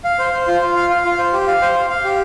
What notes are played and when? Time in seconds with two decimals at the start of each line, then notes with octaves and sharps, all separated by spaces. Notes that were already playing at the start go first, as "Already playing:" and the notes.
0.04 F5
0.19 C5
0.33 C5
0.47 F4
0.62 F4
0.76 F5
0.90 F5
1.05 F4
1.18 C5
1.33 G4
1.48 F5
1.62 C5
1.75 F5
1.90 F5
2.04 G4